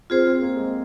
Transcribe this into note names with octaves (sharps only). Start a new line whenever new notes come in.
C4 F4 G#4 C5
C4
A#3
G#3